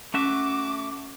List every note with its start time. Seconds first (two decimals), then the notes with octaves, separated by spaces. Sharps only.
0.14 A3 C#4 F#4 E5 D6